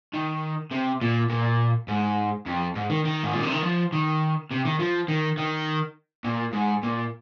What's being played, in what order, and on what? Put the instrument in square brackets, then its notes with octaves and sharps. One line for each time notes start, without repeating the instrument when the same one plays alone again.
[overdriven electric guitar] D#3
C3
A#2
A#2
G#2
F2
G#2
D#3
D#3
G#2
A#2
C3
D#3
F3
D#3
C3
D#3
F3
D#3
D#3
A#2
G#2
A#2